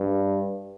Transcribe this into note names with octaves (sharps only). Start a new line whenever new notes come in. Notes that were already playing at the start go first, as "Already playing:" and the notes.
Already playing: G2